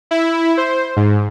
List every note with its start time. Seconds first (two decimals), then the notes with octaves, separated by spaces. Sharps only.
0.11 E4
0.57 C5
0.97 G#2